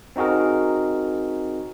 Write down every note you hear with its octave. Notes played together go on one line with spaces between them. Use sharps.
C4 D#4 F#4 G#4 A#4